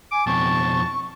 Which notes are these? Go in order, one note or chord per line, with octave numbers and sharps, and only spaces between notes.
G#5 D6
F2 B2 A5 C#6